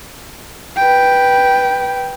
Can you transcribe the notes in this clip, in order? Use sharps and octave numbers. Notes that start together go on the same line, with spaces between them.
B4 G5